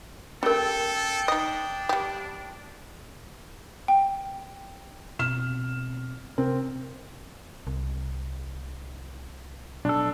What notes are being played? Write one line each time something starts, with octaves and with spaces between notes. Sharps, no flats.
G3 A3 C#4 A4 A#4 G5
D4 D#4 D#5
G3 G4
G5
B2 C4 F6 E7
C3 C4 A#4
C2
B1 D4 A4